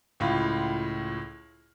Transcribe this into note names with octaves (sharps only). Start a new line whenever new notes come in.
C#2 A2 F4